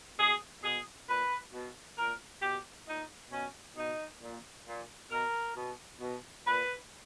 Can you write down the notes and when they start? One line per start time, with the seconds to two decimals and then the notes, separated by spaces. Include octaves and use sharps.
0.19 B2 G#4
0.64 B2 G#4
1.08 A#2 B4
1.53 B2
1.98 A#2 A#4
2.42 B2 G4
2.87 A#2 D#4
3.32 B2 C#4
3.77 B2 D#4
4.21 A#2
4.66 A#2
5.11 B2 A#4
5.56 B2
6.00 B2
6.45 A#2 B4